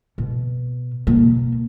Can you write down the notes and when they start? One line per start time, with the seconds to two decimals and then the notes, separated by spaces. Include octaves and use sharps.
0.18 B2
1.07 B2 A#3